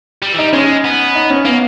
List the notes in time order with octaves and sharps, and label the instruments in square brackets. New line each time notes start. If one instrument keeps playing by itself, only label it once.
[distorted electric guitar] G3
E3
[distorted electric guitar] G3 [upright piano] D#4
[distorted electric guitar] G#3 [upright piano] C#4
[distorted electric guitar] B3
[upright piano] D#4
C#4
[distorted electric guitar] A#3 [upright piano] B3